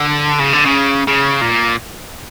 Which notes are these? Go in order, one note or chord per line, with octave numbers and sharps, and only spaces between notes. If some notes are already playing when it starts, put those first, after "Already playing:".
Already playing: D3
C#3
D3
C#3
C#3
A#2